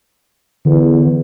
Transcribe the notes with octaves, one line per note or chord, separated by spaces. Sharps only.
E2 D3